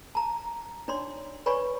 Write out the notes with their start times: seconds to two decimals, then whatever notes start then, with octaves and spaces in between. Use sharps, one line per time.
0.15 A5 A#5
0.88 D4 D#4 C#5 D5 C6
1.46 B4 C#5 D5 G#5 B5 C#6